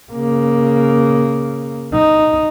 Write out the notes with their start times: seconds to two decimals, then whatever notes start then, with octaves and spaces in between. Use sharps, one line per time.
0.13 C#3 A#3
1.93 D#4